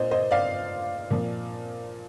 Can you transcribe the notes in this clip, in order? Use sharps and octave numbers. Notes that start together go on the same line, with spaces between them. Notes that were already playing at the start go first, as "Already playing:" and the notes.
Already playing: A#2 C5 D#5
C5 D#5
D5 F5
A#2 F3